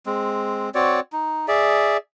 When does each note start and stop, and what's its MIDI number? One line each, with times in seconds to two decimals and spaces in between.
0.06 0.70 56
0.06 0.70 60
0.75 1.00 60
0.75 1.00 66
0.75 1.00 73
0.75 1.00 74
1.12 1.46 63
1.48 1.97 68
1.48 1.97 74
1.48 1.97 76